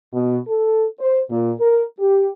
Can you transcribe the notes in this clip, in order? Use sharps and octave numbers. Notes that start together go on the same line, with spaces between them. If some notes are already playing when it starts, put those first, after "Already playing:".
B2
A4
C5
A#2
A#4
G4